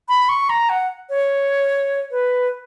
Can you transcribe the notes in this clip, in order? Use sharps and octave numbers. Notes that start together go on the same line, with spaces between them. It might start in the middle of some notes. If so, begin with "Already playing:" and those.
B5
C#6
A#5
F#5
C#5
B4